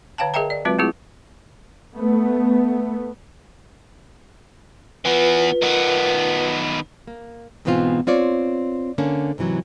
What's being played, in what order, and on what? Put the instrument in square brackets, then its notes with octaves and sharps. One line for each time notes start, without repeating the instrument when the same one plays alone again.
[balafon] D3 C#5 F5 G5 A5
G#4 A#4 D#5 E5 G5 A#5
D5
F#3 G#3 C4 F4 F#4 B4
A3 C4 E4 F4 G#4
[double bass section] A3 B3
[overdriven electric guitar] E3 B3 [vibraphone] F4 B4
[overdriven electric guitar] D#3 B3
[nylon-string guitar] A#3
G#2 B2 E3 B3 C4 F4
C4 F4 C#5 D5
D3 A#3 C#4 D4
G#2 C3 E3 F#3